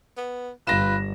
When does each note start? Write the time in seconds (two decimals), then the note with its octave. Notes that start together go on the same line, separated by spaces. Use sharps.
0.17 B3
0.67 G1 F4 B4 A#6 E7